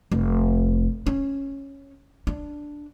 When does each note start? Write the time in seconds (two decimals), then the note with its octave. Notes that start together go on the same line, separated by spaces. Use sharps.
0.12 F1
1.06 C#4
2.27 D4